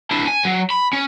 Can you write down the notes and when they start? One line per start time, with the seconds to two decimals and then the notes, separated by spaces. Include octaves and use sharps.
0.11 D4 E4
0.28 G#5
0.45 F#3
0.70 B5
0.93 C#4